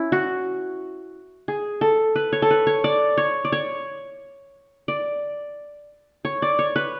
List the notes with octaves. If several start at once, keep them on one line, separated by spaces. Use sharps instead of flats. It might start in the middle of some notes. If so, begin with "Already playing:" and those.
Already playing: C#4 E4
F#4
G#4
A4
B4
C#5
A4
B4
C#5
D5
C#5
D5
C#5
D5
C#5
D5
C#5
B4